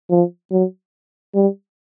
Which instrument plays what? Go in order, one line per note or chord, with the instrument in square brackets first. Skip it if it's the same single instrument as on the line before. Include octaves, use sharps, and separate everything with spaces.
[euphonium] F3
F#3
G3